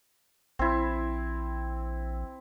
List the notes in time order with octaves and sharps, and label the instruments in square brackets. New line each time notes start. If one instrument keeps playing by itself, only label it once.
[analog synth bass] A#1 [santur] C4 E4